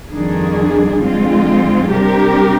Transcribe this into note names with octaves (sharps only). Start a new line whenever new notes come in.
F2 D#3 G3 D4 G#4
F2 D3 G#3 C4 F4
C3 G3 D4 G4 A#4